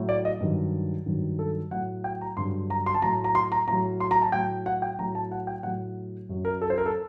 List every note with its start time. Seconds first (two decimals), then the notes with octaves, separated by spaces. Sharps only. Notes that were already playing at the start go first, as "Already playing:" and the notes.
Already playing: A2 F#3
0.09 D5
0.25 D#5
0.41 G2 D#3 F#3
1.06 G2 D#3 F#3
1.39 A4
1.71 A2 F#3 F#5
2.04 G5
2.21 A#5
2.37 G2 D3 F#3 C6
2.70 A#5
2.86 C6
2.94 A5
3.02 A2 F#3 A#5
3.24 A#5
3.35 C6
3.52 A#5
3.68 A2 A#5
3.72 F#3
4.00 C6
4.11 A#5
4.22 A5
4.32 A2 F#3 G5
4.66 F#5
4.82 G5
4.99 A2 F#3 A#5
5.15 A5
5.31 F#5
5.47 G5
5.63 A2 F#3 F#5
6.29 F#2 F#3
6.45 A#4
6.62 A4
6.70 C5
6.78 A#4
6.86 A4